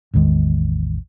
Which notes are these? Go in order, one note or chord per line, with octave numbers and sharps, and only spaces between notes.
A1 E2 D#3 G#3